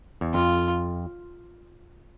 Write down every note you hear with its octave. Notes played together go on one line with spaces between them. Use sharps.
E2
F2 F4